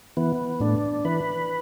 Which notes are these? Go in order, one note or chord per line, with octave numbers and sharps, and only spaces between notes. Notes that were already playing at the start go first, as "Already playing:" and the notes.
E3 B3
A2 D4
E3 B4